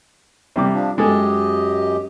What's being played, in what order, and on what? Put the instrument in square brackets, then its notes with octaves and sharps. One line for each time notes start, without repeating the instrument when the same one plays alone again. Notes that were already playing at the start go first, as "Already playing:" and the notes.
[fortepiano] C3 G3 D6
[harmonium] F3 D4
[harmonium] F#2 G4 D#5 [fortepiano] G#3 A4